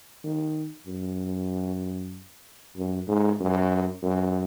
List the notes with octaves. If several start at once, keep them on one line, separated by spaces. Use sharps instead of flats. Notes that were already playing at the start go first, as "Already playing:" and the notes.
D#3
F#2
F#2
G#2
F#2
F#2